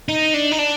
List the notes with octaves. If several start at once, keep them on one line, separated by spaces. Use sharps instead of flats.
D#4
D4
D#4
D4